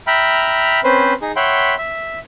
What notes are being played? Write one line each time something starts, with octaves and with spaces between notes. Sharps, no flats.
E5 G5 A#5 B5 F6
C4 C#4 B4 C5
D#4 G#4
C#5 E5 F#5 G5 B5 C6
E5